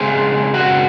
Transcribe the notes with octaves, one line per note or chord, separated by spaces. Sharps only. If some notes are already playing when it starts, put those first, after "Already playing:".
Already playing: C#3 G#3 C4 G#4
F#4